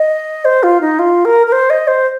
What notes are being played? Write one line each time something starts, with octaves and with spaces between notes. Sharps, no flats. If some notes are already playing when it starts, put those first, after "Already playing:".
Already playing: D#5
C5
F4
D#4
F4
A#4
A#4
C5
D#5
C5